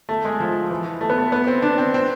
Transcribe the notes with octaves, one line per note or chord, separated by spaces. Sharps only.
A3
G#3
F3
E3
A3
B3
A3
B3
C4
D4
C4
C4